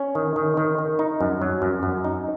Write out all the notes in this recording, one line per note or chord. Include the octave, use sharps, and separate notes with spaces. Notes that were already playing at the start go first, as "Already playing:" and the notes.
Already playing: C#4
D#3
D#3
D#3
D#3
D#4
F#2
F#3
F#2
F#2
D#4